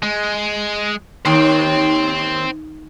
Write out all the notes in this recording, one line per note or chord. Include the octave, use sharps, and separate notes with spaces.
G#3
D#2 C5 G5